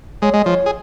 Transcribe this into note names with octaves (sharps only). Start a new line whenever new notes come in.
G#3 C#5
G#3 D#5
F3 C#5
G#4